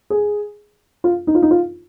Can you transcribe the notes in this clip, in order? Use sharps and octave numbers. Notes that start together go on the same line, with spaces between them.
G#4
F4
D#4
F4
D#4
F4